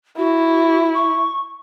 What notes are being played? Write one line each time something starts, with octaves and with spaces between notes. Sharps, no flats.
E4 F#4
C#6